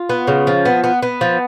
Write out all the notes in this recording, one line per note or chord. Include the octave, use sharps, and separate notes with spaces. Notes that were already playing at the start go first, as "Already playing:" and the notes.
Already playing: F4
B3
C#3
F3
B3
B3
B3
F3